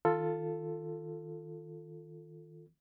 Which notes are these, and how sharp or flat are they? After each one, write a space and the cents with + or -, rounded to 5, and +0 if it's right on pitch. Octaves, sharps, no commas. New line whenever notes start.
D#3 +15 F4 +0 A4 +10